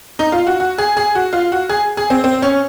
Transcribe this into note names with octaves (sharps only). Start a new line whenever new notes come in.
D#4
F4
F#4
F#4
G#4
G#4
F#4
F4
F#4
G#4
G#4
C4
C4
C#4